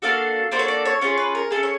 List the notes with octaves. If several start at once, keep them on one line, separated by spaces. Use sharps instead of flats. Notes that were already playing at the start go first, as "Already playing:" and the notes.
A#3 D4 F#4 A4 F5
A#3 D4 F#4 A4 C5
C#5
D5
C#5
C#4 F4 G#4 C#5
B4
A#4
F4 G#4 A4
C#4
C#5